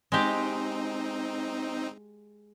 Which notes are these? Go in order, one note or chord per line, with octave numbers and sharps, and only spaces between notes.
G#3 C4 D#4 G4